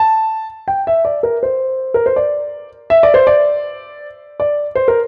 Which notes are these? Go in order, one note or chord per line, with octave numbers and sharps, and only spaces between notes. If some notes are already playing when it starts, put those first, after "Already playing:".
Already playing: A5
G5
E5
D5
A#4
C5
A#4
C5
D5
E5
D5
C5
D5
D5
C5
A#4